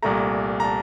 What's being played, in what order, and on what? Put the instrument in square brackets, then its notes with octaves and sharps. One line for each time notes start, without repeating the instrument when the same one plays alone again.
[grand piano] C2 A#2 A3 A#5
A#5
A5